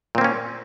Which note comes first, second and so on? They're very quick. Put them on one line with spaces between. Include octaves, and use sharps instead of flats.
A#2 C4 A#3 C#4